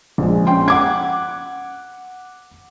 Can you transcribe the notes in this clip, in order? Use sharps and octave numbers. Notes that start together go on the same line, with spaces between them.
A#1 G#3
C#4 G5 C6
F#5 D6 G#6